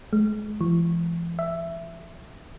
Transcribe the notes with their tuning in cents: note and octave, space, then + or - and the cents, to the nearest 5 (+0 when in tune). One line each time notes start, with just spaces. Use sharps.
G#3 +30
E3 +45
E5 +10